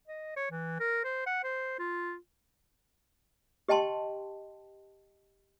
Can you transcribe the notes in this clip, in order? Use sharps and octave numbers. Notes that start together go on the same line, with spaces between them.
D#5
C#5
E3
A#4
C5
F#5
C5
F4
G4 D#5 G5 A5 C6